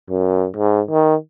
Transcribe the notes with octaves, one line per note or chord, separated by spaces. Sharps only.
F#2
G#2
D#3